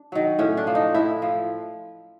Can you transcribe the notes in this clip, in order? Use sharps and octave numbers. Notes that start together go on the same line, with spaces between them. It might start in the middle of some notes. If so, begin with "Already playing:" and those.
Already playing: D4
D#3 F#3
A2 C#4
D4
F3
D#4
A2 E4
F3